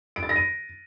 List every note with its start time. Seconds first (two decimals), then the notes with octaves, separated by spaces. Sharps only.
0.16 D7
0.23 A6
0.29 A#6
0.36 D#7